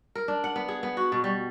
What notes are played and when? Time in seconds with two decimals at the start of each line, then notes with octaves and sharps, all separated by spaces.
0.15 A#4
0.28 D4
0.44 F#5
0.56 B3
0.68 G#4
0.83 B3
0.97 F#4
1.12 B2
1.24 G3